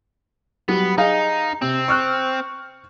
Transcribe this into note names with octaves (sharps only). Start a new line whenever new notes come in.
F#3 G3 B3
D#4 G#4 D#5 F5
C3 C4
C#6 F6 F#6